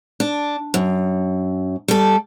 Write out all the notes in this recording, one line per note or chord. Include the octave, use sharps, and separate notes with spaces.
D4
F#2
G3 A4